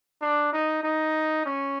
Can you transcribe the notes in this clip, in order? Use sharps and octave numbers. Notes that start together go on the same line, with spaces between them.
D4
D#4
D#4
C#4